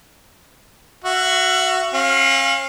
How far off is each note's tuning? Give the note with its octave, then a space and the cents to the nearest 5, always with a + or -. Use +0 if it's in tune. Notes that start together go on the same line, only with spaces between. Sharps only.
F#4 +0 E5 +35
C#4 -40 F5 +0